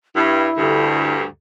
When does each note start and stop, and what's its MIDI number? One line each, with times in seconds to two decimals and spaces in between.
0.15 0.47 43
0.15 1.14 64
0.57 1.24 38
0.57 1.24 43
0.57 1.26 50
0.57 1.26 67
0.57 1.26 69